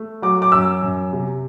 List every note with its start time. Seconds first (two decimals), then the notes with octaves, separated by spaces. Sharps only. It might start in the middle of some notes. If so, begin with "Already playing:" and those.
Already playing: A3
0.22 F#3 D6
0.42 D6
0.52 F#2 E6
0.82 F#2
1.13 C3